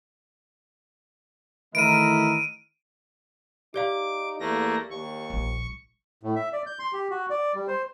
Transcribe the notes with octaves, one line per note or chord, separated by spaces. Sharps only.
D#3 E3 A3 E4 A#4 D#5 D7 D#7
D#4 G4 D5 F5 D6
E2 A3 A#3 A#6
D#2 C#6
D#1 A#1
A2
E5
D5
G6
C6
G4
F#4
D5
G3
C5